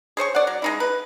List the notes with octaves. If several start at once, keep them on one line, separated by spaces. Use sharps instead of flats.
G#4 C5 C#5 C#6
D5 F#5
F#3
G#3 D#4 E4
B4